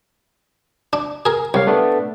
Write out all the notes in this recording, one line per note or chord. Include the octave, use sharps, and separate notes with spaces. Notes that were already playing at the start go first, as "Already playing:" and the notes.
D4
G#4 A#4
C2 C#5 F5
A3 B3 D4